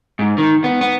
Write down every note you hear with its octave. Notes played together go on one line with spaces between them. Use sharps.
G#2
D#3
B3
B3